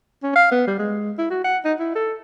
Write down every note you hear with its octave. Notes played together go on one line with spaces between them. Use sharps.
C#4
F5
B3
G3
G#3
E4
F#4
F#5
D#4
E4
A4